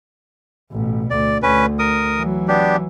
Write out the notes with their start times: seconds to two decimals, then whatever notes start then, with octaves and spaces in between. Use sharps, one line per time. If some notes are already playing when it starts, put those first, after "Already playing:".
0.71 A1 B2
1.10 D2 D5
1.43 D2 C#4 B4
1.79 A#4 D#6
2.16 E3 F#3
2.48 B3 D4 G4